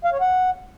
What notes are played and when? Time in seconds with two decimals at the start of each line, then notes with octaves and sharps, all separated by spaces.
0.04 F5
0.13 C#5
0.21 F#5